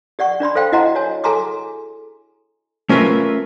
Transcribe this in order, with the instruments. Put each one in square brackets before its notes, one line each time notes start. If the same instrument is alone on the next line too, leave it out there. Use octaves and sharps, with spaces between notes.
[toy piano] G4 D5 F#5 C#6
D4 D5 B5 C6
A4 C5 F5 G5
E4 F#4 D#5 F#5 A#5 C6
F#4 C#5 G#5
G#4 A4 G#5 A#5 C6 D6
[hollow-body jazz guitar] A3 C#4 F4 A#4 B4 E5